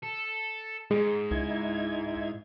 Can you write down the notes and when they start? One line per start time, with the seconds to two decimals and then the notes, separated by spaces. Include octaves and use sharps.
0.03 A4
0.91 G#2 G#3 G#4
1.31 C#2 D#4 E4 G#6